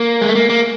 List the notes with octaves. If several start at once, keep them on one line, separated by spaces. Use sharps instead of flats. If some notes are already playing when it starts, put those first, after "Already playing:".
Already playing: A#3
G#3
A3
A#3
A#3